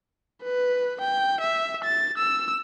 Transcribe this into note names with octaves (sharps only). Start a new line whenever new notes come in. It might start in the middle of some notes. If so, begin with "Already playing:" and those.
B4
G5
E5
A6
E6